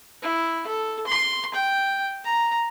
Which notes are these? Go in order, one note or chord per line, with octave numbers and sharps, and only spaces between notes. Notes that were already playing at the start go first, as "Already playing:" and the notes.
E4
A4
C6
G5
A#5